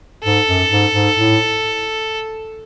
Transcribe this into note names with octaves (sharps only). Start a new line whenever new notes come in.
G#2 A4
F#2
G#2
G#2
A2